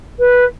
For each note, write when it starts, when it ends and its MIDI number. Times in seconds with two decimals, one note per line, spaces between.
0.19 0.45 71